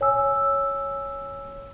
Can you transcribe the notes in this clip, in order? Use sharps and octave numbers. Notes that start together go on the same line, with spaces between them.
C#5 G#5 E6